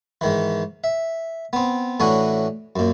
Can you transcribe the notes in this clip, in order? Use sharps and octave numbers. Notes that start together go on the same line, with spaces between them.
G#2 D#3 E3
E5
B3 C4
A2 E3 C#4 D4 F#4 G#5
F#2 A#2